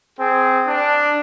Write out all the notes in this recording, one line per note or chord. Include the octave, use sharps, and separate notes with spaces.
C4 G#4
D4